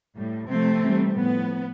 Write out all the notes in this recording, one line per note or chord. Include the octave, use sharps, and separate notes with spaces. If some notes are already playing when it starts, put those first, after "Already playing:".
A2 G3
C3 F3 A3 C4
C3 E3 G3
A2 F3 B3